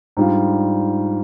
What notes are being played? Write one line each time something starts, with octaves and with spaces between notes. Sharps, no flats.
G#2 G3 D4 F4